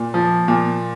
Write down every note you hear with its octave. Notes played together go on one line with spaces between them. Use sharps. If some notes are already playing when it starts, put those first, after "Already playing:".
Already playing: A#2
F3
A#2